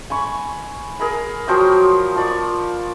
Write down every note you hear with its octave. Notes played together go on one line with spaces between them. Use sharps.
G#5 B5 C#6
G#4 A#4 B5
F3 F#3 G5 D#6
F3 D5 C#6